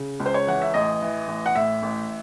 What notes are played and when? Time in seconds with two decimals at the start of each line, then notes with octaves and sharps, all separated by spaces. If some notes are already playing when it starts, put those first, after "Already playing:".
Already playing: C#3
0.20 C#2
0.26 C5
0.34 C#5
0.47 E3 F#5
0.62 E5
0.74 A1 D#5
1.02 E3
1.28 A1
1.46 F#5
1.55 A2 E5
1.83 A1